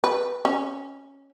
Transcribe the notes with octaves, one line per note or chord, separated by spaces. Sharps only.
B4
C#4